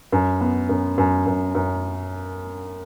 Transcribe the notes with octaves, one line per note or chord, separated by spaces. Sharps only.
F#2
B3
F#2
F#2
F#2
F#2